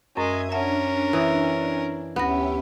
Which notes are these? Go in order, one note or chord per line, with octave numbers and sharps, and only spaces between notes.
F#2 G#3 C#4 A#4 E5 D#6 G#6
C#4 D4 A#4 E5 F#5 A5
E3 D#6
D2 B3 C#4 G4 E5 A#6